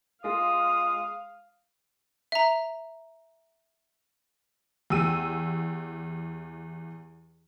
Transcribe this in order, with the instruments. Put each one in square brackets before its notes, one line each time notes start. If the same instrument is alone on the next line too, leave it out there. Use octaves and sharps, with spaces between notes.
[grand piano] G#3 F4 [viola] F5 [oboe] D#6
[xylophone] E5 A#5
[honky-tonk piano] E2 G4 E6 D#7